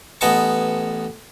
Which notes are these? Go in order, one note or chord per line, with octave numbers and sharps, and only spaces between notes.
A1 B3 D#5 G#5 A5 C#6